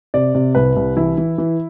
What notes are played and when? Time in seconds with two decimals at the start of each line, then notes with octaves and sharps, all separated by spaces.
0.14 C3 D5
0.35 C3
0.55 C2 B4
0.76 C2
0.97 E3 E4
1.18 E3
1.38 E3